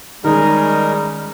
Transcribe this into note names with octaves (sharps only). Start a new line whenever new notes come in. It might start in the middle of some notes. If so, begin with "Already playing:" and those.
D#3 G3 G#3 C#4 D#4 A#4 A#5